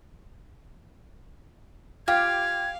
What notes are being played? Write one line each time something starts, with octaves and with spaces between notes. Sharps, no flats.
F4 G4 F5 G#6